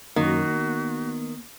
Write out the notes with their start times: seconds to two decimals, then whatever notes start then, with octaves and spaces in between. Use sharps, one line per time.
0.16 F#2 D#3 A#3 F#4
0.55 B3